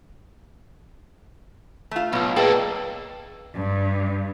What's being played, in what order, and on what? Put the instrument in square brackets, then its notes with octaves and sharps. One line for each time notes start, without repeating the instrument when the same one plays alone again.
[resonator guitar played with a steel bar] A3 F4
[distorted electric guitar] B1 [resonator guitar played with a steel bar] B2 F4
[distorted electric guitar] A#3 A4 [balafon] G#4 B4 D#5 [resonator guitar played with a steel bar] D5 G5
[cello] G2